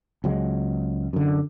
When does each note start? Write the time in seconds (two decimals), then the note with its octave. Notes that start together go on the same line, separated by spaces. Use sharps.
0.24 C#2 F#3 G#3
1.13 F#2 D3